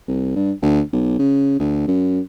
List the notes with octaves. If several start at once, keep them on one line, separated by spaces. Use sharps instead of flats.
C2
G2
D2
B1
C#3
D2
F#2